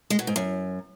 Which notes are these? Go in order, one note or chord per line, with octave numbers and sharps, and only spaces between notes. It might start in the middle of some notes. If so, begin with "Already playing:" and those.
G#3
B2
G#2
F#2